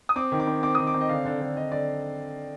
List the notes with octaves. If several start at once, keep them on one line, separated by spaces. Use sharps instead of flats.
D#6
C4 D6
D#3
D6
C4
C4 D6
D#3 D#6
D6
C4
D#5
D3 F5
D3
D3
D3 D#5
D3 D5